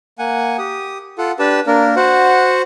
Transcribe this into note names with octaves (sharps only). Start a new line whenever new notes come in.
A#3 F#5 G#5
G4 D#6
F4 A4 F#5
D4 G4 B4 A5
A#3 D4 A#4
F#4 C5 F#5